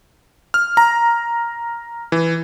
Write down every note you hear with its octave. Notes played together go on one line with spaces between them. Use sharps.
F6
A#5
E3